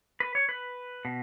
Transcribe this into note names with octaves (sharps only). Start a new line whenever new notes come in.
B4
C#5
B4
B2